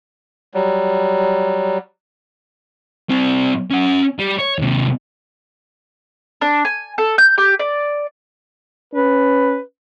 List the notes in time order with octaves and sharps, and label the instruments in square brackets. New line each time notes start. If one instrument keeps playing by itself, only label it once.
[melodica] F#3 G3
[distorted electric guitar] G3 C4
C#4 F#5
G3
C#5
D#2 C3
[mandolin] D4
G#5
A4
G6
G4
D5
[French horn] C#4 [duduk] B4